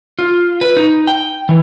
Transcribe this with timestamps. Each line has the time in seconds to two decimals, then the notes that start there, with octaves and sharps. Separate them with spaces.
0.19 F4
0.61 B4
0.77 D#4
1.07 G5
1.49 E3